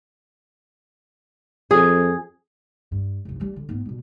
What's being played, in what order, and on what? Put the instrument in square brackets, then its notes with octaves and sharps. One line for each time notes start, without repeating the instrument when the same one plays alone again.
[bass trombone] F2 [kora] G#4
[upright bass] G2
C2 F2
E3 G3
D3
G#2 B3
B2 G3